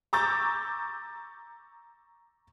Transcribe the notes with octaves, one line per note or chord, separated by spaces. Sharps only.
A#5 C#6 D6 E6 G6 A6